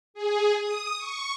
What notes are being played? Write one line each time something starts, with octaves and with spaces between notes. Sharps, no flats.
G#4
D#6
C#6